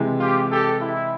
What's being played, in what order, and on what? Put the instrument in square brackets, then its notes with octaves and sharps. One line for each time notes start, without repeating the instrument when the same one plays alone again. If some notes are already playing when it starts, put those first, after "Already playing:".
Already playing: [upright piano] C3 E3 G#3
[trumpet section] F4 G4
G4 A4
E4